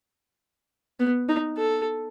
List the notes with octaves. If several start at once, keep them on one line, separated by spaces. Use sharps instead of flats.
B3
D#4
A4